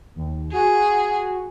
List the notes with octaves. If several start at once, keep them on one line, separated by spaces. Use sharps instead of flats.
D#2
F#4 G#4